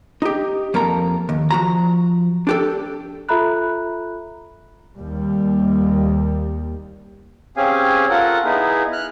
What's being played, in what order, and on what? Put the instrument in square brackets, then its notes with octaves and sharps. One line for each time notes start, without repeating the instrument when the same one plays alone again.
[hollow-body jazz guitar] D#4 G4
F2 A#3 A4 A#5
D#2
F3 F#4 A#5
D4 G4 A4
[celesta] F4 A4 E5 A#5 B5 F#6
[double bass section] D#2 G3
[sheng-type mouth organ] C4 C#4 G4 G#4 F5 G#5
F4 A4 A#4 F#5
B3 D#4 E4 G#4
F6 F#6